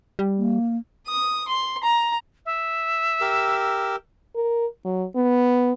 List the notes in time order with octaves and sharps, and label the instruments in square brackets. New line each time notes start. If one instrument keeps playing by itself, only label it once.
[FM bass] G3
[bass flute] A#3
[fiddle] D#6
C6
A#5
[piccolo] E5
[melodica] G4 A#4 E6
[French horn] A#4
F#3
B3